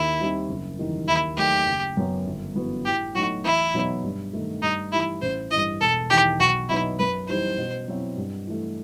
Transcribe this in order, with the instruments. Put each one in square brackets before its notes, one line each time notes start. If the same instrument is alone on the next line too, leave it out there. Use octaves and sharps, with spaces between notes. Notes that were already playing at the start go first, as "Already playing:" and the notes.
Already playing: [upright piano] D#2 [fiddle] E4
[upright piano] D#3 G3 C4 D#4
F#1
E2 D#3 G3
[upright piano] D#2 [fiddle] E4
[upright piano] D#3 F#3 A3 [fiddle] G4
[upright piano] F#1
F#2 F#3 B3
G1
F#2 E3 B3 F#4
[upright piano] A2 [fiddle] G4
[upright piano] F#3 A3 D#4 [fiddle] F#4
[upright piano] E2 [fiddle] E4
[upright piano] B2 F#3 B3 D#4
G2
D#3 A3
[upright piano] G2 [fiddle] D#4
[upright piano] E3 G3 D#4 [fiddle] E4
[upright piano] A1 [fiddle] C5
[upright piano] E3 [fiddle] D#5
[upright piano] G2
[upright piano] E1 [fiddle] A4
[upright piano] E2 D#3 [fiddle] G4
[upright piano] B1 [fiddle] F#4
[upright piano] B2 F#3 B3 D#4 [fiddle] E4
[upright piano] F#2 [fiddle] B4
[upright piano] E3 G3 D#4 [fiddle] C5
[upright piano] B2
F#3 C4 E4
G2
E3 A3